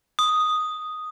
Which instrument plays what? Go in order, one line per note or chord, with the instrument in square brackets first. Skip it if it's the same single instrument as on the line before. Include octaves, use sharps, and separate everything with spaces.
[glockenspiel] D#6